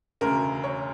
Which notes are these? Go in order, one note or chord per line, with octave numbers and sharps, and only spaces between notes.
E1 D2 C#3 A#4
C#5